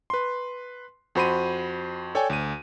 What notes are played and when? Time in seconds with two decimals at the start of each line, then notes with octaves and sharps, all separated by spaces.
0.10 B4 C6
1.15 F2 F#4 C5 B5 C6 D#7
2.15 A4 C#5 D5 G5 G#5
2.30 D2 D#7